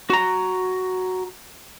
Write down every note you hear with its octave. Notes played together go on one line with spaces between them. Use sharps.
F#4 A#5